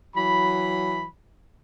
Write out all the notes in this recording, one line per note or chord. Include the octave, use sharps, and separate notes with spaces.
E3 F#3 B5